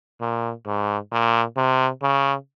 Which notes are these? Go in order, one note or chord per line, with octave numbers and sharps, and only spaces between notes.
A#2
G#2
A#2
C3
C#3